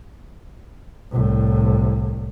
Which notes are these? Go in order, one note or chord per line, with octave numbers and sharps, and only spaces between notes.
C2 A2